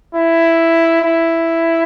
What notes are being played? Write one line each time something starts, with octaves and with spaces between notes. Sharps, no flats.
E4
E4